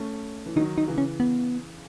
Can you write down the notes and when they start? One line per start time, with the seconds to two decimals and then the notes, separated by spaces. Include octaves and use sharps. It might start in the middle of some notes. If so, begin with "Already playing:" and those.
Already playing: A3 C#4
0.46 E3
0.56 D#3 F#3 D#4
0.78 D#4
0.88 C#3 E3
0.98 C#4
1.20 B3